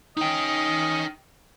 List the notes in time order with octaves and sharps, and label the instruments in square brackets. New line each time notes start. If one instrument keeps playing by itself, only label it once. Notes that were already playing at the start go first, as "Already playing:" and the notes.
[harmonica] C#4 D#5 [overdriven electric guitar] D#4 G5